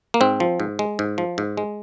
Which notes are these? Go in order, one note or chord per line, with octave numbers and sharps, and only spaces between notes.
A#3
G#2 C4
F3
G#2
G#3
G#2
F3
G#2
G#3